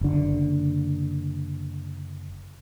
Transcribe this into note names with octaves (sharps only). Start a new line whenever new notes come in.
F#1 D3